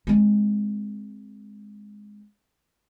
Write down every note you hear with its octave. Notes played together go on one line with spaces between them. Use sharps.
G#3 C4